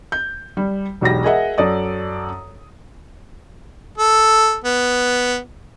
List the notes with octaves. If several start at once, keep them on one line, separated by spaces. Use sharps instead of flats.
G6
G3
E1 B1 G4 A#6
G#4 A#4 D#5 E5 F#5
F#2 A4 D5 D#6
A4
B3